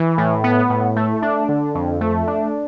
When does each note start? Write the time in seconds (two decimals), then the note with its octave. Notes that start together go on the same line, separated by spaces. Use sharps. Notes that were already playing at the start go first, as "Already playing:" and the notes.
Already playing: E3
0.18 A2
0.44 B3
0.70 A2
0.96 A3
1.22 D4
1.49 D3
1.75 F2
2.01 A3
2.27 D4